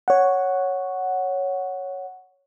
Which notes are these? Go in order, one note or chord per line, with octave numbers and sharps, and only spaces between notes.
C#5 F#5